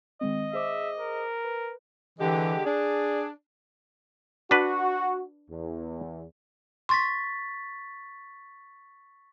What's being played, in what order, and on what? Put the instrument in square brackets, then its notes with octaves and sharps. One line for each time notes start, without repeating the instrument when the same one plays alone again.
[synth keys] D#3 G#3 C4 [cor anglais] D#5
[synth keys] G#4 C5 D6 [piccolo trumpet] E5
[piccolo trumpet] A#4
[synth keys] B4
[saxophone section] D3 G#3 G4 [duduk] E3
[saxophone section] D4 [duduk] G#4
[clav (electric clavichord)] D4 B4 [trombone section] F#4
[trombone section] E2
[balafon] C6 [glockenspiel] C#6 A6 B6